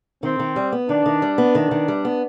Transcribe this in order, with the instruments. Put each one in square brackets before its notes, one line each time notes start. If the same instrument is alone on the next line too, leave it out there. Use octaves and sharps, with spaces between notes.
[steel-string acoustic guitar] D#3 [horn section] C4
[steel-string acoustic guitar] D#3
G3
B3
[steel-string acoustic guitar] D#3 [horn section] D4
[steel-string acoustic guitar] D#3
G3
B3
D#3
D#3
G3
B3